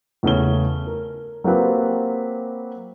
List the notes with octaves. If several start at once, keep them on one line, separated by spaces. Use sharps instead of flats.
E2 C#3 A3 C#4 G7
A#4
F#3 A#3 C4 F4 G4 B4